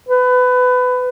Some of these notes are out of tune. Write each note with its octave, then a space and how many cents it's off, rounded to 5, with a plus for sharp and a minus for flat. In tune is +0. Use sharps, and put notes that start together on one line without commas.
B4 +20